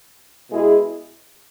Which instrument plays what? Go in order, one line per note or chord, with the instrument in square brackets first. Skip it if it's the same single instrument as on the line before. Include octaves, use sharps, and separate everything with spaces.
[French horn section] B2 G#3 E4 G#4